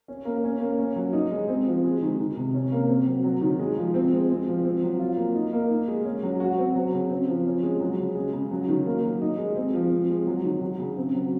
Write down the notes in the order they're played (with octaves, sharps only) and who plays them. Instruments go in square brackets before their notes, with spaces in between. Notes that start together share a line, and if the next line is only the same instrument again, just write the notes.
[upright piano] C#4
A#3
C#4
A#3
C#4
F#3
D#4
G#3
C4
F3
G#3
D#3
D#3
C3
C#4
A#3
C4
F#3
F#3
D#3
G#3
F3
C4
G#3
C4
F3
C4
F#3
F4
A#3
D#4
A#3
D#4
G#3
C#4
F#3
F#4
C4
F#3
C#3
C4
F3
C#4
G#3
F#3
C#3
G#3
C#3
F#3
D#3
A#3
F#3
D#4
G#3
C4
F3
C4
G#3
F#3
D#3
F#3
C#3
C4
F#3